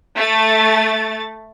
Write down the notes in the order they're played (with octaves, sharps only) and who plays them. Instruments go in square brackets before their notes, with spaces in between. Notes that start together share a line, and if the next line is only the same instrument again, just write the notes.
[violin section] A3 A6